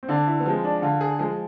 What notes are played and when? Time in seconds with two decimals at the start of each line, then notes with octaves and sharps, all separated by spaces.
0.03 C4
0.09 D3 D4
0.27 E4
0.40 B3
0.46 F3 G#3 C4
0.64 D4
0.82 D3 F4
1.01 G#4
1.19 F3 G#3 G#4